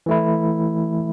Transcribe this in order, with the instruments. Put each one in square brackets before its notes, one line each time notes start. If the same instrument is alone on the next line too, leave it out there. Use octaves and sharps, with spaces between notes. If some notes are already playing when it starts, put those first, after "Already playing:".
[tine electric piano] E3 A3 E4